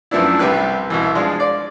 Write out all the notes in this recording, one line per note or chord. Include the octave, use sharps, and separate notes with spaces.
F#2 F3 A3 B3 D4 E4
C2 C3 G3 G4 B4 F#6
C2 B2 E3
F3 G#3 D4 F4
D5